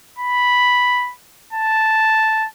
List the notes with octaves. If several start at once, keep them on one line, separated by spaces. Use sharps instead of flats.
B5
A5